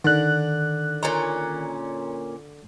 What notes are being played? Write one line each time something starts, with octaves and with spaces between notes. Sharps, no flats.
D3 D#3 F#6
A#2 C#4 A#5